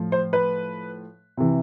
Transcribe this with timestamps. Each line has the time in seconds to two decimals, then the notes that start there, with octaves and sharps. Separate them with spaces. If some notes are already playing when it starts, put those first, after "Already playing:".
Already playing: A2 F3
0.12 C5
0.33 B4
1.37 C3 E3